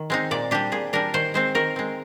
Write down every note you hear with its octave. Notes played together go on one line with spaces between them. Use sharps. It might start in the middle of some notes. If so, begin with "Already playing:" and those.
Already playing: D#3
G#3 C4 D#4
A#2 D5
G3 D4 G4
A#2 G#4
G3 D4 A#4
D#3 C5
G#3 C4 C5
D#3 A#4
G#3 C4